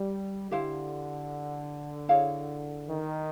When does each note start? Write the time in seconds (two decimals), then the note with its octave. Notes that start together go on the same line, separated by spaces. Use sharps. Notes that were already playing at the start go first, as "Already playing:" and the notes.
Already playing: G3
0.51 D3 E4 G4 C5 F5
2.09 E4 G#4 C#5 F5
2.88 D#3